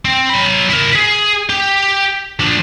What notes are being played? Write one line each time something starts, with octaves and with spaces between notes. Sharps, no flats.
C4
F#3 B5
E4 A#4
G#4
G4
F3 D4